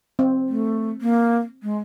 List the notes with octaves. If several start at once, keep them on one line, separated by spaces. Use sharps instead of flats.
C4
A3
A#3
G#3